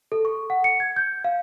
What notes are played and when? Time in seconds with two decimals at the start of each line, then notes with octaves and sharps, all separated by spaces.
0.12 A4
0.25 C#6
0.50 F#5
0.64 C#7
0.80 G#6
0.96 G6
1.24 F5